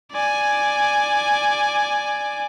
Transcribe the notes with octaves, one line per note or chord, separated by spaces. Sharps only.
D5 G#5